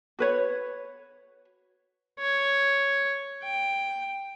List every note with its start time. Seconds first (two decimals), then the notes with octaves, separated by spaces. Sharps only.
0.19 F#4 B4 C#5
2.19 C#5
3.43 G5